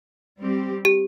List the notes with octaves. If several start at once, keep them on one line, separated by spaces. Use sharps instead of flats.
G3 C4 G4
G4